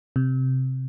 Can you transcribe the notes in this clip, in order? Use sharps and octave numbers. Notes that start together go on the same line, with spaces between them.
C3